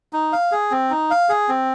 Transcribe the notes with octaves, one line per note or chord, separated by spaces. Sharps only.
D#4
F5
G#4
C4
D#4
F5
G#4
C4